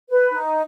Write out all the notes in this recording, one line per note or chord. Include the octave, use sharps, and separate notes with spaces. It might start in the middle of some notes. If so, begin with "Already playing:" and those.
B4
D#4